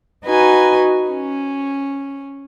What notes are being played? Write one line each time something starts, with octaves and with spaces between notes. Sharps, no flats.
D#4 F#4 B4 G#5
C#4